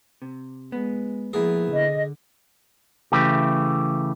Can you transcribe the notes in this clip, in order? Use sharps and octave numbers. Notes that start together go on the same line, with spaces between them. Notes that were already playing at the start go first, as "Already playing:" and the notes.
C3
G#3 B3
F3 A#3 B3 E4 G#4
D3 D#5
C#3 E3 A3 G4